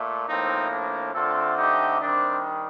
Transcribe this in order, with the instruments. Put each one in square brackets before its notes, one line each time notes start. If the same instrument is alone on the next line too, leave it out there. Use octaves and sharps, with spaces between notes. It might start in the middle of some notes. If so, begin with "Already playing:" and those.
Already playing: [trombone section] A#2 A3
A2 F3 A#3 C4 D#4
D4
D3 A3 C4 F4 A4
D#4 G4
D#3 G3 C4 D4